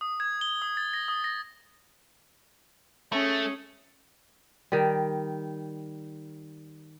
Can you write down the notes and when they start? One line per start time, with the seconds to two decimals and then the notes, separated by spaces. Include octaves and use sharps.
0.01 D#6
0.20 G#6
0.41 G7
0.62 D#6
0.77 A6
0.94 A#6
1.08 D#6
1.24 A#6
3.12 A3 C#4 G#4
4.72 D#3 G3